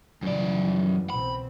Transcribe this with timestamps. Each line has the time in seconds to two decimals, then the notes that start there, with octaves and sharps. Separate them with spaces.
0.22 F#2 C#3 E3 G3 D5
1.10 C2 B2 C4 B5